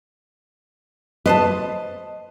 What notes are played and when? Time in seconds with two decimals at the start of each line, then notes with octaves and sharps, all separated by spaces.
1.26 B4 C5 D#5 A5